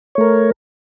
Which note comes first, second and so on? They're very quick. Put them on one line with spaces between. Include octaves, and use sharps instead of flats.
C#5 A3 A#4